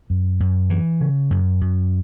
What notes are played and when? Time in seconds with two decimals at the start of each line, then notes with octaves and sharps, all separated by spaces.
0.10 F#2
0.40 F#2
0.70 E3
1.01 C#3
1.31 F#2
1.61 F#2